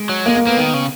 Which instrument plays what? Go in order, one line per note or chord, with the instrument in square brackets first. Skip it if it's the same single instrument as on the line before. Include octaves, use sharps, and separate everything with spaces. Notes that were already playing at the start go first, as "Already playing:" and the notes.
Already playing: [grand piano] G#3
[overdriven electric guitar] F#3
[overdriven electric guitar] G#3 [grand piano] A#3
[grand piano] A#3
[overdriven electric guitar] A#3 [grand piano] B3
[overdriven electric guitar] D#3
C#3